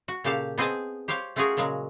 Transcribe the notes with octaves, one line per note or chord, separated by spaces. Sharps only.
F#4
A#2 C#3 G4 A4 F5
B3 C4 G#4 D#5 G#5 A5
G4 C5 C#5 F5 G5
A3 C#4 F4 F#4 G#4 A#4
A#2 C#3 F#3 G#3